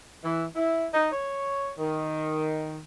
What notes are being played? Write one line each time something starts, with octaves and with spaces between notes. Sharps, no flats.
E3
E4
D#4
C#5
D#3